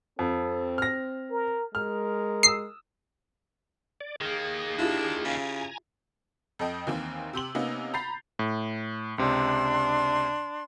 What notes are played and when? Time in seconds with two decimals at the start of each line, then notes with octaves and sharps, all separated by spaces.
0.19 F2 C4 A4
0.78 F6 A#6
1.31 A#4
1.75 G#3 A#4 F6
2.43 D#6 E6 C7
4.01 D5
4.21 D#3 A#3 G#4
4.78 D4 E4 F4 G4
5.25 C#3 G#5 A#5
6.59 F2 A4 D#5 G5
6.87 D#2 D#3 E3 A#3 C4
7.33 C3 G4 C6 F#7
7.55 C3 A#3 B3 C#4 D#4
7.94 A#5 B5 G6 A6 C7 F7
8.39 A2
9.18 C#2 C3 D4 C6